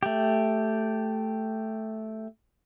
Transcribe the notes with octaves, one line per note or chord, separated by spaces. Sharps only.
A3 G4